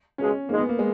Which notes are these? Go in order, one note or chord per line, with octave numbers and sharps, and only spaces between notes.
C#2 B2 G#3 C#4
A#1 G#2 D#3 G#3 A#3
B3
A#3
G#3